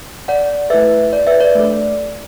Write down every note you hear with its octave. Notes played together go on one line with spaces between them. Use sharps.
D5 F#5
A3 E4 A4 B4 E5
D5
B4 E5
D5
A3 D4 A4 D5